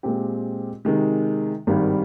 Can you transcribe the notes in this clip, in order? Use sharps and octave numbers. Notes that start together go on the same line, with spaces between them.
A#2 G#3 C4 G4
C3 D#3 G#3
G#1 G2 D#3 G3